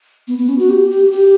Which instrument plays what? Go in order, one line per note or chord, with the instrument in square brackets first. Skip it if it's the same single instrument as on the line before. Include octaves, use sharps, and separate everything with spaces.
[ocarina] B3
B3
C#4
F#4
G4
G4
G4